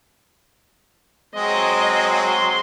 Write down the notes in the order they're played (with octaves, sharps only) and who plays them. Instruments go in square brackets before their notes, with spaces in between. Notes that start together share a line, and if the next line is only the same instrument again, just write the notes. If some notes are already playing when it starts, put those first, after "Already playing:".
[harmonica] F#3 G#3 C4 [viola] D#5
[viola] C6